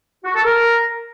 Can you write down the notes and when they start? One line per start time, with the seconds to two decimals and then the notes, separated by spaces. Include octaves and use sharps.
0.24 F#4
0.35 A4
0.45 A#4